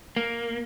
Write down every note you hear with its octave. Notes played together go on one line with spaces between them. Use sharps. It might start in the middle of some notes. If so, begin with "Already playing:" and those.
A#3